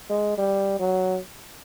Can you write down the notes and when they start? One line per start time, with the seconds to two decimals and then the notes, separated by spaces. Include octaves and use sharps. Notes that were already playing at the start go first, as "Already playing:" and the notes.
0.10 G#3
0.38 G3
0.80 F#3